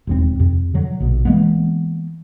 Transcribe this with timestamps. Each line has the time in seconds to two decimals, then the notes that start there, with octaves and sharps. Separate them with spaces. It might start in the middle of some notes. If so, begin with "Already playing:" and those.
0.07 E1 D#2 C4
0.39 F2 C3
0.74 D3 F#3
1.00 A#1 B2
1.25 E3 G#3 A#3 B3